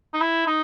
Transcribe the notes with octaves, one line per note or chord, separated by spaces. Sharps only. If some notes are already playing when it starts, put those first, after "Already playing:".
D#4
E4
D#4